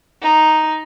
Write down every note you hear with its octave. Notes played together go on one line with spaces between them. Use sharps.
D#4